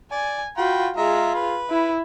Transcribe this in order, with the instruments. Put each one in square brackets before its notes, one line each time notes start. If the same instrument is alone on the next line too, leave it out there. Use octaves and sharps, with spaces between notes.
[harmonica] D5 [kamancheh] G#5
[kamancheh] F4 F#4 [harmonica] G5 B5
[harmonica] G#3 E5 A#5 [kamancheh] F4 G#4
[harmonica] B4
[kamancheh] E4